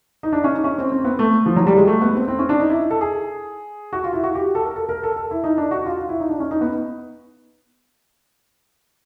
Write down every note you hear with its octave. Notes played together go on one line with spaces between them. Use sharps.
D#4
D4
C#4
D#4
C#4
C4
C4
B3
A3
F3
F#3
G3
G#3
A3
B3
C4
C4
C#4
D4
D#4
E4
A4
G#4
F#4
F4
E4
F#4
G4
A4
A#4
A4
A#4
A4
A4
E4
D#4
D4
F#4
F4
F4
E4
D#4
D4
C#4
D#4
B3